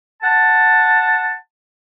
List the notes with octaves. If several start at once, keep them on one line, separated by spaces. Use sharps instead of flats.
F#5 A5